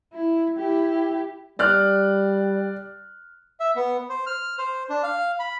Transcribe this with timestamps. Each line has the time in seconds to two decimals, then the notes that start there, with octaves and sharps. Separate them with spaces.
0.13 E4
0.58 E4 G4
1.59 G3 D5 F6 F#6
3.60 E5
3.76 B3
4.09 C5
4.27 F6
4.58 C5
4.90 D4
5.03 F5
5.40 B5